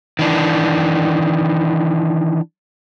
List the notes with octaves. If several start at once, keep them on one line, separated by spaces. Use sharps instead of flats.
D#3 E3 D4